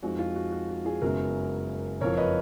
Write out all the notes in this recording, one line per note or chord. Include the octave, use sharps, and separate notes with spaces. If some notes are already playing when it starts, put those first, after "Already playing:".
F2 F3 G#3 D#4 F#4
F4
F#4
F#4
F#4
F4 G#4
F#1 F#2 C#3 G#3 B3 F#4 A#4
F#1 F2 F3 A#4 C#5
B4 D#5